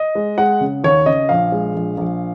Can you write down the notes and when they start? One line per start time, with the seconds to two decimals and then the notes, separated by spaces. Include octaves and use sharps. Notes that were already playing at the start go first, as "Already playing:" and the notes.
Already playing: D#5
0.15 G#3
0.38 G#3 F#5
0.61 C#3
0.84 D#2 C#5
1.06 C#3 D#5
1.29 A#1 F5
1.52 G#3
1.75 A#1
1.98 A#1